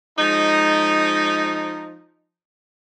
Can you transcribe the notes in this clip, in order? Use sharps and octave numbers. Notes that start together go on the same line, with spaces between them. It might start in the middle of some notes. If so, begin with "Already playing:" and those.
F3 G#3 D#4